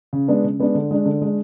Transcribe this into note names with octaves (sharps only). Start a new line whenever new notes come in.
C#3
G#3 B3 D4
C#3
G#3 B3 D4
D3
G#3 D4
D3
G#3 D4